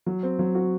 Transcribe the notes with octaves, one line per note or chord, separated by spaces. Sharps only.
F#3
C4
F#3
F#4